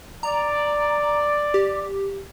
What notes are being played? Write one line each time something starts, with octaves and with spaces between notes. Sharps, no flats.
D5 A#5
G4